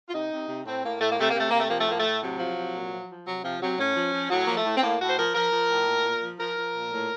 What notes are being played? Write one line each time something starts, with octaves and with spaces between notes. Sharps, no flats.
F4
C3 D#4
C3
C3
A2 C4
A2 A#3
A2 A3
A#3
C3 A3
C3 A#3
A3
C3 A#3
A3
F3 A#3
A3
A2 A#3
A3
A2
C3 F#3
F3
C3
A#2
F3
F3
C3 F#3
C3 F3
C3 F#3
A2 C#4
F3
F3
A2 F#3
F3 A#3
A3
A2
C4
A2 A#3
A2 F#4
C5
F3 A#4
F3 A#4
F3
A2
A#2
A#2
F3
F3 A#4
F3
A#2
A2